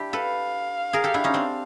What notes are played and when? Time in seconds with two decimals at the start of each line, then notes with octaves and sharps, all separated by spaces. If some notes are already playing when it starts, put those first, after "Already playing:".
Already playing: D4 E4 G4
0.13 A4 B4 F5
0.93 G#4 A#4
1.04 G4 A4
1.14 D4 E4
1.24 C#4 D#4
1.34 C4 D4